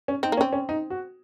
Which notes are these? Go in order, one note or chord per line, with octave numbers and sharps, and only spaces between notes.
C#4
C4 D#4
A#3
C#4
C4
C#4
D#4
F#4